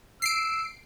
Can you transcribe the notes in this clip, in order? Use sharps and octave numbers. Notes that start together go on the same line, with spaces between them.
E6 C7 D7